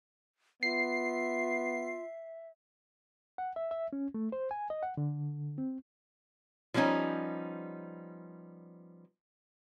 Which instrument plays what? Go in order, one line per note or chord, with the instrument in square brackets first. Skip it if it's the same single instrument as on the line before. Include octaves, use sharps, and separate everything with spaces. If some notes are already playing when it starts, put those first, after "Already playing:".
[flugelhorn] B3 [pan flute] F4 [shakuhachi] E5 [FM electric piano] C7
[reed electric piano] F#5
E5
E5
C#4
A3
C5
G#5
D#5
F#5
D3
C4
[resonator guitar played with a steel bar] F3 G3 B3 C#4 D#4